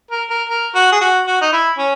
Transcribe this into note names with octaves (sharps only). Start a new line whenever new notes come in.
A#4
A#4
A#4
F#4
G#4
F#4
F#4
D#4
E4
C#4